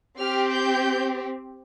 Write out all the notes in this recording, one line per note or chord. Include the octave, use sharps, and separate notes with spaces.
C4 G4 F6
G6